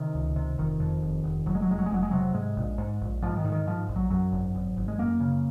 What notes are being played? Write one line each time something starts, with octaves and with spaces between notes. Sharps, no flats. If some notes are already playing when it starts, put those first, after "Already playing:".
Already playing: C3 D#3
C#2
C3
F1 D#3
F2
F1
F1
F1 F#3
G#3
F#3
F1 G#3
F#3
G#3
F1 F#3
G#3
C3 F#3
G#2 G#3
A#1
G#2
A#1
G#2 F3
D#3
G#2
D#3
G#2 F3
A#1
F#3
F#2 F#3
G#1
G#1
G#1
G#3
F#2 A#3
C#3